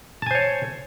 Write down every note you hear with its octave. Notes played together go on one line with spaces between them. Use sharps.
C5 C#5 G#5 A5